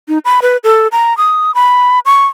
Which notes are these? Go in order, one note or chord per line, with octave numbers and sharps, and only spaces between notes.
D#4
B5
B4
A4
A#5
D#6
B5
C#6